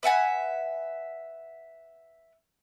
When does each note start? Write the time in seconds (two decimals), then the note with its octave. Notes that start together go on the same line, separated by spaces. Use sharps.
0.03 B4 E5 F#5 G#5